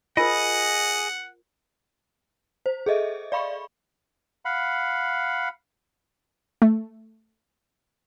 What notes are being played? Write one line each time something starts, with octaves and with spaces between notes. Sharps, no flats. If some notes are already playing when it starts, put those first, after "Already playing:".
F4 G#4 A#4 C5 D#5 F#5 D#6
C5
G#4 A4 D#5 E5
D5 F5 B5 C#6
F5 F#5 B5
A3